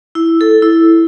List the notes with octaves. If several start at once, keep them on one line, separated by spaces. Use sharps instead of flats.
E4
A4
E4